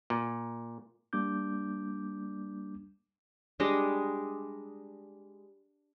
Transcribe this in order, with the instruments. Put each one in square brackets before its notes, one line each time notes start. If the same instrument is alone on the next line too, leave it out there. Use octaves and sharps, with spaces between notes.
[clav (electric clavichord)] A#2
[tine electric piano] G3 A#3 D4 D6 G6
[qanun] G3 G#3 D4 D#5